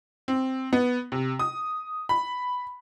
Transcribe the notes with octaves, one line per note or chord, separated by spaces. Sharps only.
C4
B3
C3
D#6
B5